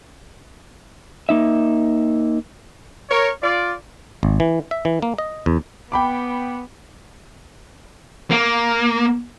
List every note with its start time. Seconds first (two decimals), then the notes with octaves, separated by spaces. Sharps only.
1.29 A#3 D#4 E5
3.10 A#4 C#5
3.42 F4 D5
4.23 G#1
4.40 E3
4.71 E5
4.85 E3
5.02 A#3
5.18 D#5
5.46 E2
5.92 B3 G5 B5 D6
8.31 A#3